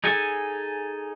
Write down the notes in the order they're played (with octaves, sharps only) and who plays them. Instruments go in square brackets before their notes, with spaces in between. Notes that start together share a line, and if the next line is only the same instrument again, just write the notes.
[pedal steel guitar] D#4 G#4 A4 G#5